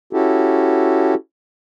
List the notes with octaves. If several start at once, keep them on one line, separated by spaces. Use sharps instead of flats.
C#4 E4 F#4 G4 A4